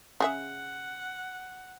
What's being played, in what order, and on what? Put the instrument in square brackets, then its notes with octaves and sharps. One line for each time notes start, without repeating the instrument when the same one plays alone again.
[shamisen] C#3 G#4 E5 [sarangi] F#5